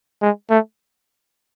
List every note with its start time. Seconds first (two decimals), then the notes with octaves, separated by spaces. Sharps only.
0.22 G#3
0.50 A3